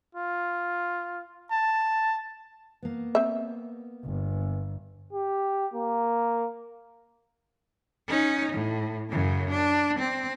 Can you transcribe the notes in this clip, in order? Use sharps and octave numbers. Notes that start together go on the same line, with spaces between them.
F4
A5
A#3 B3
C4 E5
G1
G4
A#3
C#4 D#4
A2
F#2 C#3
D4
C4